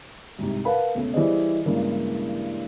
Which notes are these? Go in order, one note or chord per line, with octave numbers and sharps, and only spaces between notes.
C2 G#2 C3
A#4 B4 F5 F#5 A5 B5
E1 C#3 A3
E3 G3 E4 G#4 C5 D#5
G2 C#3 E3 G#3 A#3 E4